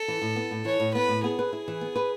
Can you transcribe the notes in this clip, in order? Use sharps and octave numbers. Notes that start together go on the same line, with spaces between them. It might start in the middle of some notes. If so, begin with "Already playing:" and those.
Already playing: A4
E3
A2
B3
A2
E3 C#5
A2
B3 B4
A2
B3 G#4
B4
E4
E3
B3
B4